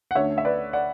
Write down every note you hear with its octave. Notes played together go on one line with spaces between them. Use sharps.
F#5
D2 D3 A3 C#4 C#5 E5
E5
B4 D5
D5 F#5